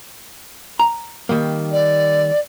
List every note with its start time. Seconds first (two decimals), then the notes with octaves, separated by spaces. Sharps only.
0.79 A#5
1.29 D#3 G3 A#3
1.72 D5